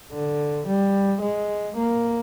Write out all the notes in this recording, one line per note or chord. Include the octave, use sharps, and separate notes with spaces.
D3
G3
G#3
A#3